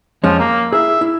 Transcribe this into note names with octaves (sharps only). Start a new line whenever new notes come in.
F2 F3 G#3 C#4
A#3 A#5
E4 G#4 E5
E4